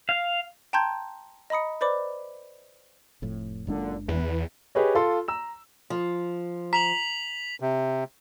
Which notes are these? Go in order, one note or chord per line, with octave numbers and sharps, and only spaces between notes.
F5
G5 A5 A#5 C6 G6 G#6
D#5 A#5 B5 D#6 C#7
B4 C5 D5 B5 D6
F1 F2 A2
F#1 F#2 A#2 D3 G#3 D4
E2 E3 B4
G4 G#4 B4 C#5 D#5
F4 A4 C6
A#5 E6 E7
F3
A#5 B6 F7 F#7
C3